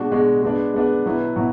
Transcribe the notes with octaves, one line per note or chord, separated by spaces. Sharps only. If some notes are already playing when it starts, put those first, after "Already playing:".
Already playing: B2 G#3 D4 F#4
B2 G#3 D4 F#4
G#3 B3 D4
G#3 B3 D4
B2 F#3 B3 E4
B2 F#3 E4